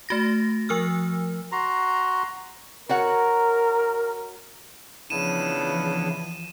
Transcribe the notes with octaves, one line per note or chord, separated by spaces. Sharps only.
A3 F#4 A#6
F3 A#4 E6 F6
F#4 A#5 C6
F#4 A#4 C#5 F#5
C#3 E3 F3 B3 D4 E4 D#7 E7